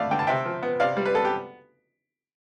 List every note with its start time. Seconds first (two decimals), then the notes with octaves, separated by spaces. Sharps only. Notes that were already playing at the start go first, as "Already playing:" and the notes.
Already playing: D3 A3 D5 F5
0.11 D3 G5
0.19 A5
0.27 C3 E5 G5
0.45 F3
0.63 B3
0.80 C3 D5 F5
0.97 G3
1.05 B4
1.14 B3 A4
1.25 G4